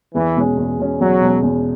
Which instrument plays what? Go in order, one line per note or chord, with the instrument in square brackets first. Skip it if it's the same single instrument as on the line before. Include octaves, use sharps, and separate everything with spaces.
[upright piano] E2 [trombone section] E3
[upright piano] B2 G#3 C#4
E2
B2 G#3 C#4
[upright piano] E2 [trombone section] F#3
[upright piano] B2 G#3 C#4
E2